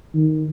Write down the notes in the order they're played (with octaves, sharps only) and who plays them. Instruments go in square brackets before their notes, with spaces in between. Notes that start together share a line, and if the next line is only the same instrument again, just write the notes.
[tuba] D#3